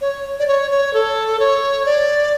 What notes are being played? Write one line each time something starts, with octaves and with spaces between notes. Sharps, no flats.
C#5
D5
C#5
C#5
A4
C#5
D5